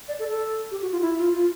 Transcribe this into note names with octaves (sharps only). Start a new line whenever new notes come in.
D5
A4
A4
G4
F#4
F4
E4
F4
F4